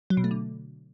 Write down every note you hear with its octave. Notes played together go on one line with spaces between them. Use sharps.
F#3
B2
A3
D3